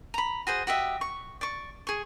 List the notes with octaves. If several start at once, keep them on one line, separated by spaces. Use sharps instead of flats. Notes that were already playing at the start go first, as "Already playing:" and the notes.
A#5 B5
F#4 G#4 C5
F#4 G4 D#5 E5
C#6
D5 C#6
G#4 C#6